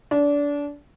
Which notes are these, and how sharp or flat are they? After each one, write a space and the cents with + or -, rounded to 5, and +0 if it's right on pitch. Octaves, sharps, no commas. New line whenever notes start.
D4 -25